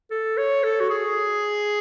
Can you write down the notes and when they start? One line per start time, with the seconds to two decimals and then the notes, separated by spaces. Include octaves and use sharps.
0.11 A4
0.37 C#5
0.64 A4
0.80 F#4
0.90 G#4